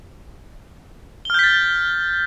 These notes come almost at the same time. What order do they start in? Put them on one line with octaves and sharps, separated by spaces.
G7 F6 G6 B6 A6